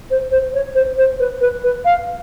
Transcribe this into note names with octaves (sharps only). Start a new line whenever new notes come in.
C5
C5
C#5
C5
C5
B4
B4
B4
F5